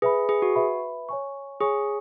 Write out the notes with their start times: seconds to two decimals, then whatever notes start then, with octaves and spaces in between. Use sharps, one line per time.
0.02 G#4 B4 E5 B5
0.29 G#4
0.42 F#4
0.55 B4 E5 B5
1.09 C#5 G#5 C#6
1.61 G#4 C#5 G#5 C#6